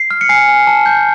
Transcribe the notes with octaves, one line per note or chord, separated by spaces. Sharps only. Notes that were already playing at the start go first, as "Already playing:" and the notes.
Already playing: C7
F6
C#7
G#5 C7
G#5
A5
G6